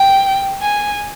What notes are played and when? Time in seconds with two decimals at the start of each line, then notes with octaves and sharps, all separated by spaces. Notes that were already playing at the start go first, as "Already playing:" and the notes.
Already playing: G5
0.62 G#5